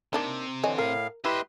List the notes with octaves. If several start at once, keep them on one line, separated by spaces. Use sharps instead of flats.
C3 A#3 D4 D#4
D3 E3 C#5 D#5 G#5
A2 A#4 F5
E4 G4 B4 D#5 E5 C6